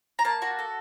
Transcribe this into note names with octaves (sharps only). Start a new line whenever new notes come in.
A#5
A#3 A5
F#4
A4